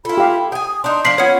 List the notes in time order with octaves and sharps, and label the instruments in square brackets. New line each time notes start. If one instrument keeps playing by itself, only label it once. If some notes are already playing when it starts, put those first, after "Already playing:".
[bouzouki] E4 A4 [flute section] F4 B5
[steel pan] G4 F5
[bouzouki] G5 G#5 [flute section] D#6
[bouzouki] D4 D#4 [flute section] C6
[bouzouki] F3 D4 [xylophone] B6 C7 F#7
[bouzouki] B3 C#4 [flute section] F4 G#6 [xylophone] C#5 F#5